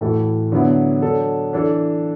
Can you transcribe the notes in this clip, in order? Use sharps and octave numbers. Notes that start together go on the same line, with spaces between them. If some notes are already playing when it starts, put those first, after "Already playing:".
A2 E3 A3 F#4 A4
D3 F#3 B3 E4
F#3 D4 A4
E3 D4 A4